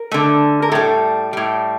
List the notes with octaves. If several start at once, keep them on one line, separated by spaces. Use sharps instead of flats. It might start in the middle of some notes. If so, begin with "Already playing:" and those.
Already playing: A#4
D3 A3
A#4
A2 G3 A4
A2 G3